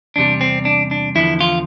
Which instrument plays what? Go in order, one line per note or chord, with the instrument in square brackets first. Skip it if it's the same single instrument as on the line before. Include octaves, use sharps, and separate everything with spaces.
[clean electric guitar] E2 C3 G3 D4
C4
D4
D4
E2 D3 F3 E4
F4